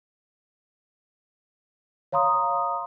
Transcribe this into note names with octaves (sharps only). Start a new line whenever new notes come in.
C#5 F5 A#5 C6 D#6